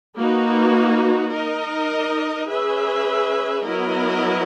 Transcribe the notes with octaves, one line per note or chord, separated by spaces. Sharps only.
A#3 D#4 F#4 B4
D#4 A#4 D#5
C#4 G#4 B4 E5
F#3 B3 E4 A#4 D#5